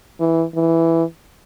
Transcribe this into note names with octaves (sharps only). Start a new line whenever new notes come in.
E3
E3